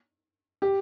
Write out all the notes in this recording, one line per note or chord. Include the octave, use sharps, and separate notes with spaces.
G4